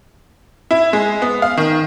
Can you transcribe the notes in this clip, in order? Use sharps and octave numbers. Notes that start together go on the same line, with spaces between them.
E4
G#3
B3
F5
D#3